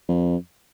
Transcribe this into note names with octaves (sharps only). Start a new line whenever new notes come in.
F2